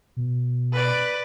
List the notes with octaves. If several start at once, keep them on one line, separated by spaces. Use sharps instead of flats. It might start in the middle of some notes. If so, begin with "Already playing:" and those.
B2
B4 D5